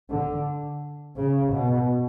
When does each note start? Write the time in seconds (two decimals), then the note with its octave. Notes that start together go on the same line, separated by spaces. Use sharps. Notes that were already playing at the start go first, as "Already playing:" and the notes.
0.10 D3
1.16 C#3
1.53 B2